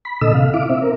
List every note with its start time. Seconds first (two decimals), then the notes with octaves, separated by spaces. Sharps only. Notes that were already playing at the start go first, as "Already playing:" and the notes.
0.05 B5
0.21 A#2 D3 A4 D#5 E6
0.34 C3 F5
0.54 E4 F5 D6
0.70 C4 E5
0.82 C4 A#4